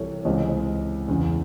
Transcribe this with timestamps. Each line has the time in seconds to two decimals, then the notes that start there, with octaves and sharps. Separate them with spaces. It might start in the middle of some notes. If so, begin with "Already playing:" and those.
Already playing: C2 C3 E3 A4 C#5
0.25 C#2 C3 E3 C5 D#5
1.08 E2 C#3 E3